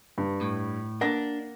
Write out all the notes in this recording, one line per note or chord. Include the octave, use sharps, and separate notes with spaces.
G2
A2
A#3 D4 F#5 A#6